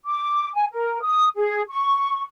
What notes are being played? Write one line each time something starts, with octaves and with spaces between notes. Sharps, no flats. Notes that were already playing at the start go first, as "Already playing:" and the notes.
D6
G#5
A#4
D#6
G#4
C#6